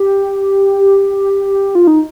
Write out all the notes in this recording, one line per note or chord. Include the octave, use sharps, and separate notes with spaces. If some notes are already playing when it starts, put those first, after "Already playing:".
Already playing: G4
F4
D#4